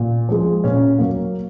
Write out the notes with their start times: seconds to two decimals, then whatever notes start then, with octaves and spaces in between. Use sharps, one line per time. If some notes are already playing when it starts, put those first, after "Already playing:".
Already playing: A#2
0.29 F3 G#3
0.64 A#2 C#4
0.99 F#3 A#3